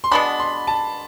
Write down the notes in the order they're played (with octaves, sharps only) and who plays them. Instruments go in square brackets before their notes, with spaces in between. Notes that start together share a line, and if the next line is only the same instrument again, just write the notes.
[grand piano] C6
[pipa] B2 G#3 B3 D4 [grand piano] B5
[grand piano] C6
A5